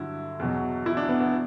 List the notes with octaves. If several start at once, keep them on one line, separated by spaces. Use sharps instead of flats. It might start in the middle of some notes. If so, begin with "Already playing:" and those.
Already playing: G2 D3 F#3 E4
E2 B2 F#3
E4
D4
B3
B3